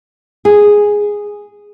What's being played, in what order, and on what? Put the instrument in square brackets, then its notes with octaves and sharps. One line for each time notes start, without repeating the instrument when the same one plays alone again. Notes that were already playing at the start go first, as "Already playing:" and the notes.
[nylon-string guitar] G#4